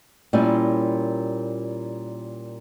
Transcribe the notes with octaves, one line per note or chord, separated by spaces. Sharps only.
A#2 G3 C#4 E4